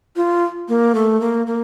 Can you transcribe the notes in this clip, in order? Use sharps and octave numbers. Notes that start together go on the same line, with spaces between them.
F4
A#3
A3
A#3
A#3